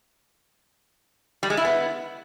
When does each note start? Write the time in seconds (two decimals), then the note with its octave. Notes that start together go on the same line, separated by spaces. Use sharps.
1.43 G3
1.50 G#3
1.57 E4
1.65 B3